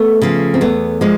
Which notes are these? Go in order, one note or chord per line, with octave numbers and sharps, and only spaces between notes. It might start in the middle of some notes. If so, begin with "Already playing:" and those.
Already playing: A3 B3
C#3 F3
C4
E2 A3 B3
F3 G#3 A#3